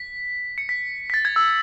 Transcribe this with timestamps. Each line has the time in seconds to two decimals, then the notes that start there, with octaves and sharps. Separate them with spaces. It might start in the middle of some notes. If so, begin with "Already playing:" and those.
Already playing: B6
0.58 C#7
0.69 B6
1.10 B6
1.14 A6
1.25 G#6
1.36 E6